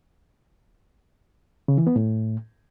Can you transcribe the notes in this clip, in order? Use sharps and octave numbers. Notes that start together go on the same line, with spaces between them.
C#3
E3
B3
A2